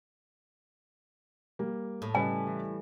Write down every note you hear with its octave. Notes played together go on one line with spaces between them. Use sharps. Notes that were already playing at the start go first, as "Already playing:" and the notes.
G3 A#3
A2 D#6
C#3 G3 B4 D#5 G#5
E3